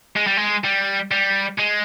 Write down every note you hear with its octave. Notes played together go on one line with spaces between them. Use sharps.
G#3
G3
G#3
G3
G3
G#3